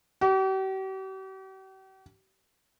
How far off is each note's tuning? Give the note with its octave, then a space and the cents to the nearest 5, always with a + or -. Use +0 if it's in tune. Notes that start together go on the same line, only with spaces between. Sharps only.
G4 -45